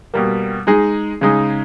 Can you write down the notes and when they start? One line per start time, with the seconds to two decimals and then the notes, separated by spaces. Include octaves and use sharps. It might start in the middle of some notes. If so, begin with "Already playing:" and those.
0.14 B2 G3 A#3
0.67 G#3 D#4 G#4
1.21 C#3 G#3 D#4